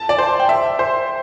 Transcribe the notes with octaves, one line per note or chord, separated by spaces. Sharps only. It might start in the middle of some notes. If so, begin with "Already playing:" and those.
Already playing: A5
D5
C5
G5
E5
C5